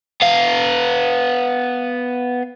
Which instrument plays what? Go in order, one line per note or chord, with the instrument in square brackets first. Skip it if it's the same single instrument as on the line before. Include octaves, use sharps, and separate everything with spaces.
[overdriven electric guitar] B3 F5